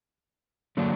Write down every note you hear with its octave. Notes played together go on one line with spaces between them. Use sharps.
D3 F#3 A#3 D4